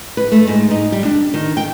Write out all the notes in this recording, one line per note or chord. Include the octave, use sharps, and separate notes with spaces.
B4
A3
G#2
D#4
G3
D4
D#3
G5